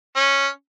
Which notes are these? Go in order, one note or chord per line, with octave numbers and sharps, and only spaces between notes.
C#4